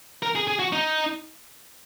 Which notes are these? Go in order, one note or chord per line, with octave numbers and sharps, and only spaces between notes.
A#4
G#4
G#4
F#4
D#4